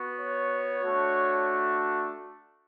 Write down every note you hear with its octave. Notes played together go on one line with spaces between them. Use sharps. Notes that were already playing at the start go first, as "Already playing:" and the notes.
Already playing: B3 F#4
C#5
A3 D4 F#4